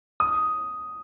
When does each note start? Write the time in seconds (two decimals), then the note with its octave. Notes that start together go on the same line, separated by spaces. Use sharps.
0.20 D#6